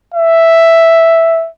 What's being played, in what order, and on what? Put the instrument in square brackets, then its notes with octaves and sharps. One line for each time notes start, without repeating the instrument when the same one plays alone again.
[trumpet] E5